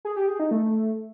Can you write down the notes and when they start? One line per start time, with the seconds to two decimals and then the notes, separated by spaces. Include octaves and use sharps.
0.05 G#4
0.16 G4
0.28 G#4
0.39 D#4
0.51 A3